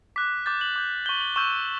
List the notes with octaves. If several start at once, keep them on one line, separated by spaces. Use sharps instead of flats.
D6 F#6 B6
D6 G6 A6
F#7
D6 G6
C#6 G6 G7
F#7
C#6 E6 G6 E7